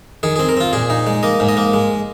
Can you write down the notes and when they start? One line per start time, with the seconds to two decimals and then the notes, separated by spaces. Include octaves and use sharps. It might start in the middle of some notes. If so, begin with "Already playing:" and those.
0.23 D#3 G#4
0.36 C4 G#4
0.49 A#4
0.57 C4 F4
0.73 A#2 G#4
0.90 D#4
1.07 G#3
1.23 A#3 D#5
1.40 G#2
1.49 D#5
1.57 A#3
1.73 G#3